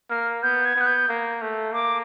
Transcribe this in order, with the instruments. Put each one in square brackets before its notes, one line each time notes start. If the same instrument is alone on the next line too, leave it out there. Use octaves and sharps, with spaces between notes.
[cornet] A#3 [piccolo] F6
[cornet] B3 [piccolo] G6
[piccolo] G#6
[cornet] B3
[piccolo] F#6
G6
[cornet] A#3
A3
[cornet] A#3 [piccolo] D6